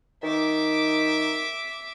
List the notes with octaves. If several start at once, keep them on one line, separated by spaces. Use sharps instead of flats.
D#3 E5 D6